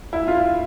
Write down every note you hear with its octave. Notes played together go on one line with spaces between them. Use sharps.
E4
F4